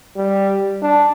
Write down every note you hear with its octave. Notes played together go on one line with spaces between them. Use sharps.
G3
D4